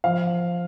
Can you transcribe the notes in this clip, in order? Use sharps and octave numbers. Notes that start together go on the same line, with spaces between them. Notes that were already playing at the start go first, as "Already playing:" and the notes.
F3 F5